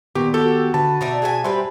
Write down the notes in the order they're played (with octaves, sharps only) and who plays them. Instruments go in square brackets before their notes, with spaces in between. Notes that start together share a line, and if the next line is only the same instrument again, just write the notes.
[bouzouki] A#2 [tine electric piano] D#3 B3 C#6 [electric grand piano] G4
[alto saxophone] F#4 [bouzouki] G4 [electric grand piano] A4
[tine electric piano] D3 [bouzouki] B4 [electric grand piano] A5
[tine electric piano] B2 [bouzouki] D#4 D5 E5
[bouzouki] G#4 E5 G#5
[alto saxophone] G3 [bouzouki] G4 B4 C5 [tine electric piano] E5 G#5